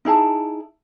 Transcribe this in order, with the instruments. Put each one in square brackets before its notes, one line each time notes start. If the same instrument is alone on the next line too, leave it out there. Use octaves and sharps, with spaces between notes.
[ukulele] D#4 E4 G#4 A5